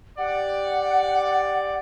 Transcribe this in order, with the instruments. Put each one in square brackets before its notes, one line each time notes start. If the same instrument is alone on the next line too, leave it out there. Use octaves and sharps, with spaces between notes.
[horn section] G4 D5 [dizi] F#5